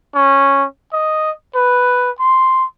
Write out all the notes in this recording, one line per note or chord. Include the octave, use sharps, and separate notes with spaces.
C#4
D#5
B4
C6